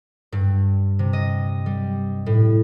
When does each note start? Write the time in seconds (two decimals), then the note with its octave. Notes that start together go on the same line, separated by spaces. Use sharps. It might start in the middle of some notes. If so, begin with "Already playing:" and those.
0.32 G2
0.99 C3
1.13 D#5
1.66 G3
2.26 A2